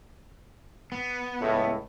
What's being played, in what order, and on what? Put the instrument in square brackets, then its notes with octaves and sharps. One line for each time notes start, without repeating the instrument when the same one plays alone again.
[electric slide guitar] B3
[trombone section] C#2 A2